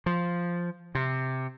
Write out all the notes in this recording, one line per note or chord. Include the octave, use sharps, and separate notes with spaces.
F3
C3